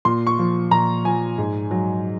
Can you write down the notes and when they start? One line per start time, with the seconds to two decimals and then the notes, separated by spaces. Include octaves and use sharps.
0.05 A#2 C6
0.27 C#6
0.39 F3
0.71 A#2 A#5
1.05 F3 G#5
1.38 G#2
1.71 F#3